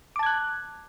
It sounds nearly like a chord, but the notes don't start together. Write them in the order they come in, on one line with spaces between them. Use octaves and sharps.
D6 A5 G#6 F#6